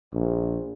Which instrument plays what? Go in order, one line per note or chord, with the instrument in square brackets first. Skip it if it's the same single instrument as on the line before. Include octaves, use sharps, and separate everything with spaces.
[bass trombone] A#1